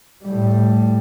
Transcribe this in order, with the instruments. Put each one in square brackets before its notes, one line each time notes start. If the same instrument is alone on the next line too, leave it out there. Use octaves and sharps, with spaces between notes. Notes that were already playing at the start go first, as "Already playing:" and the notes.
[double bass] A2 G3